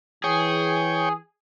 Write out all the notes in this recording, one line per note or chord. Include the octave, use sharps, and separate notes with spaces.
E3 G#4 C#5 G5